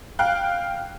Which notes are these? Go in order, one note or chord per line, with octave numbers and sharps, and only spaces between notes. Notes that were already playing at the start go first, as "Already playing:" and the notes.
F5 G5 F#6